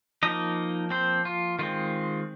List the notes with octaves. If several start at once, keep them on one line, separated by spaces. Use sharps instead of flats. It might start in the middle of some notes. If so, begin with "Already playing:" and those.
F3 A#3 D#4 D#5
C4 C5
F4
D#3 G#3 C4 F4